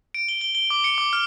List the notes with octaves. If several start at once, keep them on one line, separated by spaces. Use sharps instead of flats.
D7
G7
G7
G7
D6
C#7
D6
F6